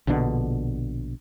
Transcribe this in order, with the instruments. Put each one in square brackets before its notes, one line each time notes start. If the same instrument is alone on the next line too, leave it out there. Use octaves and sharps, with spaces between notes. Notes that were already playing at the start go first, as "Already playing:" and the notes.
[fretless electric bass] A#1 B2 D3 D4